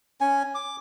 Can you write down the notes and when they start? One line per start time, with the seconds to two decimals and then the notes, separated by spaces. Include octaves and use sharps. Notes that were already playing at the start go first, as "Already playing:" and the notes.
0.21 C#4 G#5
0.55 D6